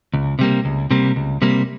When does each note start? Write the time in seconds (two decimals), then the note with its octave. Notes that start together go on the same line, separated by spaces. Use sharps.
0.13 C#2
0.39 C3 G3 A#3
0.65 C#2
0.91 C3 G3 A#3
1.16 C#2
1.42 C3 G3 A#3